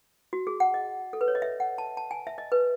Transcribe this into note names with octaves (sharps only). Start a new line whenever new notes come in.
F#4
G#4
F#5
D#5
A4
B4
C#5
D#5
E5
F#5
A5
A5
G#5
E5
D#5
B4